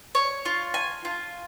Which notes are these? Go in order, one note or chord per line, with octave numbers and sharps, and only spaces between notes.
C#5
F4
G#5
F4